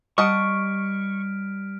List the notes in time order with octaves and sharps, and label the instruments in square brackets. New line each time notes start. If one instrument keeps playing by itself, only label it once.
[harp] G3 [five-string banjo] D#5 F#5 A5 [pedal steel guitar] C#6 [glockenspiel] F6 B6 D7